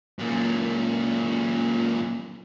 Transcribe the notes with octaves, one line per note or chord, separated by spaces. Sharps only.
F#2 A#2